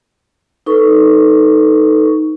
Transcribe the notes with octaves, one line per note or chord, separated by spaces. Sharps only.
D#4 A4 B4 C#6